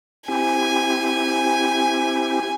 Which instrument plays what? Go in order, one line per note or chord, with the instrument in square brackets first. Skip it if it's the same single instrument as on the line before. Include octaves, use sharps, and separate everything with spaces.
[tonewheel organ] C4 E4 G4 [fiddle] G#5